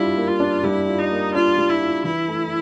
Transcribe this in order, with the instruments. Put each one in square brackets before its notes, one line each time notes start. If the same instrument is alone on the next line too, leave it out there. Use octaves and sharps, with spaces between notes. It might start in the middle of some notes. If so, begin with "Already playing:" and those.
Already playing: [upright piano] G3 D4 F4 [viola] E4
[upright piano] A#3
[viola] F4
[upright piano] D4
[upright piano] G3 [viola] E4
[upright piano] F4
[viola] D#4
[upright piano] A#3
[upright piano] D4 [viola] F4
[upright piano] G3
[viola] E4
[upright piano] F4
[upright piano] E3 [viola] E4
[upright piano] A3